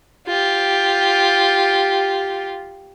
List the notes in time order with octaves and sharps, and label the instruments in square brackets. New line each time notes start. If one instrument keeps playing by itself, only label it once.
[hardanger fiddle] F4 G4